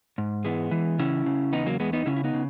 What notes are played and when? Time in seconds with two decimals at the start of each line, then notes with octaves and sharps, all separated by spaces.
0.18 G#2
0.45 E3 G#3 B3
0.71 E3
0.99 C#3 C#4 E4
1.26 C#3
1.52 E2 B3 D#4
1.66 F#3 A#3
1.80 E2 G#3 B3
1.93 B3 D#4
2.06 C#3 C#4 E4
2.17 E4
2.24 B3 D#4
2.34 C#3